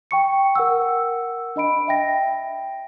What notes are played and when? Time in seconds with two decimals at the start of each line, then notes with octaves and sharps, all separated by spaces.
0.11 G5 C#6 C#7
0.55 A#4 F#5 E6
1.56 D4 D#5 B5 D7
1.88 E5 G5 A#6